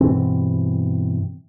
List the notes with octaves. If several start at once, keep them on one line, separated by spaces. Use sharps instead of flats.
G2 B2 E3 C4